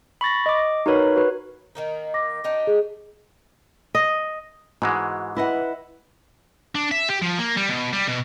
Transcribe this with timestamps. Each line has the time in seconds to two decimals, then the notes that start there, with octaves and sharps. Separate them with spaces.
0.21 B5 C#6 A6 A#6
0.46 D#5 D6
0.86 D#4 F#4 A#4 B4 C#5 B5
1.16 F#4 B4
1.75 D#3 A#3 D#4
2.14 D6 A#6
2.44 D4 D#4 G4
2.67 G#4
3.95 D#5
4.82 G#2 E3 G#3 F#4
5.36 E4 B4 D#5 F#5
6.75 D4
6.91 E5
7.09 G4
7.22 F3
7.38 A#3
7.57 G3
7.69 B2
7.93 G3
8.08 B2